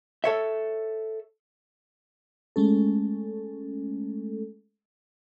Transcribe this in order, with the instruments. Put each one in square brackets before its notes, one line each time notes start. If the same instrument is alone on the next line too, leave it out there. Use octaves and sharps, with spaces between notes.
[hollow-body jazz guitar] A4 C#5 E5
[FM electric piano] G#3 A3 C#4 A4